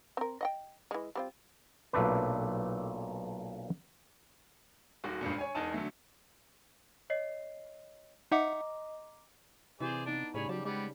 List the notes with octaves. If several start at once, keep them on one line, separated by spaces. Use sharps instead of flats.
C4 A#4
D#5 F#5 G5
E3 G#3
G3 C4 F4
B1 A#2 A3 D4 B4
D#1 D#2 F#4
G1 C#2 G2 A#2
C#5 G#5
E1 E2 D#4 G#5 A5 D#7
D3 F#3 A3
C#5 D#5 C7
D#4 D#5 E5 F#5 A#5 D6
C3 E3 G#4 C5 D5
B3 D4 D#4
A2 C#3 G3 G#4 C#5 B5
F#3 G3 A5
G3 G#3 B3 C4